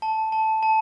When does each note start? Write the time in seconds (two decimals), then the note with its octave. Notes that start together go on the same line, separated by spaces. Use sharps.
0.02 A5
0.32 A5
0.63 A5